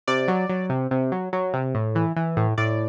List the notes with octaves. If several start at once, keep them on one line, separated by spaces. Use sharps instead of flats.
C3 D5
F#3
F#3
C3
C3
F#3
F#3
C3
A2
E3
E3
A2
A2 D5